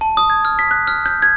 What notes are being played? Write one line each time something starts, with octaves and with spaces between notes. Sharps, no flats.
A5
D#6
G#6
F6
B6
F#6
F6
G6
G#6